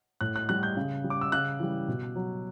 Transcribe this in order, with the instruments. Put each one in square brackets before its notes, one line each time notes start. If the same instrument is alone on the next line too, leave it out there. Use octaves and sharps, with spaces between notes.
[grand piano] A2 F#6
F#6
G3 F#6
G6
C#3
G3
D6
E6
C#3 F#6
E3 G3
B2
F#3